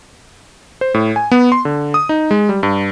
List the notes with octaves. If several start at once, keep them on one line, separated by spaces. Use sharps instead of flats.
C5
A2
G#5
B3
C6
D3
D#6
D#4
G#3
G3
G2